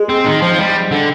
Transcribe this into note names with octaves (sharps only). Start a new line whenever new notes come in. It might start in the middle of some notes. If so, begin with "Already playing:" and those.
Already playing: G#3
C4
D#3
F3
G3
D3